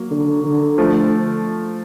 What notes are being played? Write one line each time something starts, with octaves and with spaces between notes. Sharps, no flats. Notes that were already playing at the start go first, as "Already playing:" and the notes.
Already playing: F#3 A#3
D3
D3
F3 A3